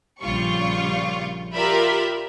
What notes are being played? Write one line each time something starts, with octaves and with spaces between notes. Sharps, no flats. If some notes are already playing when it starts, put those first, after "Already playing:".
A#1 C#3 G3 F4 C#6
F4 G4 A#4 D5 E5 B5